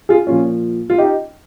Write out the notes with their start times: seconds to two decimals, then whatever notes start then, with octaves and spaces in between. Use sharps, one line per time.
0.09 F4 G#4
0.27 A#2 F3 C#4 F4
0.90 F4
0.98 D#4 G4